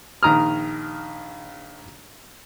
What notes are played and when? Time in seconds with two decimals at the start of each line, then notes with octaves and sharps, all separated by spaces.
0.23 A#1 D#3 A#5 D#6 F6